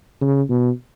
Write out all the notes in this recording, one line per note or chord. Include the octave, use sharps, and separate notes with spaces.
C#3
B2